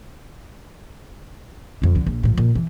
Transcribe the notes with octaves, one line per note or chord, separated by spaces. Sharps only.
F2 F3
C#2 D3
A#1
A2 F3
A#2
E3